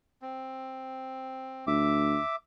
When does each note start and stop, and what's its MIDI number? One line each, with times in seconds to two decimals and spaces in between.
0.22 1.65 60
1.67 2.18 38
1.67 2.36 76
1.67 2.36 86